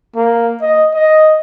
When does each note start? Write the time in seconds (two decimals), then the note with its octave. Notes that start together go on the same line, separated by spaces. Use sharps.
0.16 A#3
0.62 D#5
0.94 D#5